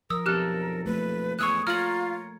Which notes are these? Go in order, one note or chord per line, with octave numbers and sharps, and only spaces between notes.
F3 A#4 D#6 E6
B1 F2 G4 A4 F6 F#6
A3 A#3 B4
E2 E3 C#5 C#6 D#6 E6 F#6
F4 A#4 C#5 A#5 F6 F#7